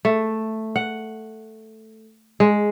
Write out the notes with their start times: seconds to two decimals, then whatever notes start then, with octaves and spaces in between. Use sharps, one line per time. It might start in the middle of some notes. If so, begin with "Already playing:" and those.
0.05 A3
0.76 F#5
2.40 G#3